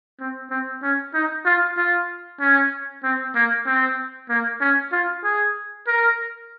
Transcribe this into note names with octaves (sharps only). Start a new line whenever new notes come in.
C4
C4
C#4
D#4
F4
F4
C#4
C4
A#3
C4
A#3
C#4
F4
G#4
A#4